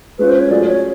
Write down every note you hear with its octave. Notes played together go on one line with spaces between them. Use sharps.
G#3 C#4 F4 B4
C5
C#5
F#3 A3 C#4 F4 G#4 D5
C#5